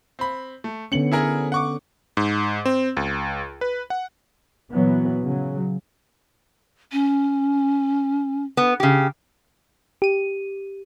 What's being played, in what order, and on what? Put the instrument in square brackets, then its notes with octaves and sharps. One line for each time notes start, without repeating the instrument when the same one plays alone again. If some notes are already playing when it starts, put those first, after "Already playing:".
[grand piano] C4 B5
A3
[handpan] D3 B3 C#4 [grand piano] C#7 F#7
[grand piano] E4 G#4 A#4
F#5 C#6 D6
[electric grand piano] G#2
C4
C#2
B4
F#5
[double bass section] A#2 E3 F#3 B3
C#3 F#3
[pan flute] C#4
[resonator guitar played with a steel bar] B3
C#3 G4
[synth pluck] G4 D#7